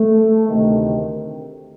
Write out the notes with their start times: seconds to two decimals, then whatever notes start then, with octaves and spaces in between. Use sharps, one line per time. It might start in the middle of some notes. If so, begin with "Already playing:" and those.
Already playing: A3
0.48 D2 C3 D#3